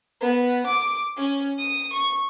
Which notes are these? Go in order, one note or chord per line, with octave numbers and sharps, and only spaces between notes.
B3
D6
C#4
D#6
C#6